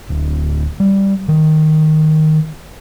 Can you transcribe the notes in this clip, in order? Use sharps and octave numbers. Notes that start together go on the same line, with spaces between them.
D1
G3
D#3